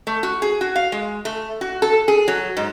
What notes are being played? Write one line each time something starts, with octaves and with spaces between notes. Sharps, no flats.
A3
F#4
G#4
F#4
F5
G#3
A3
F#4
A4
G#4
F#3
G#2